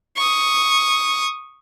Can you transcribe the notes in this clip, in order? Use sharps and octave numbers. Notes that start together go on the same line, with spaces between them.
C#6 D#6